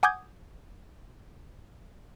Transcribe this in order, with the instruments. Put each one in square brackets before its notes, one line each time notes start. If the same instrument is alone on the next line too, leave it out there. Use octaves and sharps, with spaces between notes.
[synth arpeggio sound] F#5 G#5 D6 D#6 G6 G#6